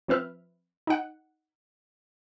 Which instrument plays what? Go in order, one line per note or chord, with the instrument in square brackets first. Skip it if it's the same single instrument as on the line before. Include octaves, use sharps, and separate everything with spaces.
[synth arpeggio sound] F3 C4 B4 E5 F6
D#4 F#5